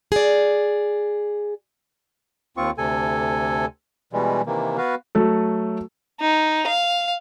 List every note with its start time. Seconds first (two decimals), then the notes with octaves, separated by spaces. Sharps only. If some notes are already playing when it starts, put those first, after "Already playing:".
0.12 G#4 D5
2.57 D#2 C4 F4 C#6
2.78 D2 C3 A4 G#5
4.13 B2 E3 G3 G#3
4.46 C3 D#3 E3 A#3
4.78 B3 F#4 B4 F5
5.15 F#3 A3 A4
6.21 D#4
6.67 F5